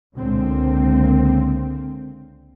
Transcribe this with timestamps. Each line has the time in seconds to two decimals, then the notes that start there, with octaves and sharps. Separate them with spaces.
0.17 C#2 D3 A#3 C4